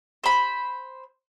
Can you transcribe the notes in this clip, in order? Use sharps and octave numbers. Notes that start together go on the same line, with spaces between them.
C5 B5